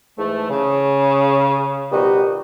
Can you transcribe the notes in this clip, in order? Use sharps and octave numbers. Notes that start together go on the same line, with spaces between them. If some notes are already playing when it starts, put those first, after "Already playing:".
G#2 E3 A3
C#3
B2 D#3 F3 G3 D#4 F#4